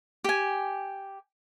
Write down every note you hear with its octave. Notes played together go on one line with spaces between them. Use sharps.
G4 G#5